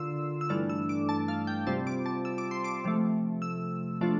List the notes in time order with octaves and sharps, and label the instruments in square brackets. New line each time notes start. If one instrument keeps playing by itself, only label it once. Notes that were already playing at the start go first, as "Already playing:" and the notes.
Already playing: [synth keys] D3 A#3 D4 F4 C6 E6
E6
G2 E3 A3 D4 F6
E6
D6
A5
F5
G5
C3 G3 C4 F4 A5
D6
A5
E6
D6
C6
D6
C3 F3 A3
E6
F3 A3 D4 F4